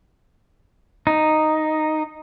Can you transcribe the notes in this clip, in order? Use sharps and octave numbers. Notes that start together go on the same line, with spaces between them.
D#4